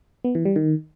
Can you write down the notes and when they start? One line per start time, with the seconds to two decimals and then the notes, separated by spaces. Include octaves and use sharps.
0.25 B3
0.35 E3
0.45 G3
0.56 D#3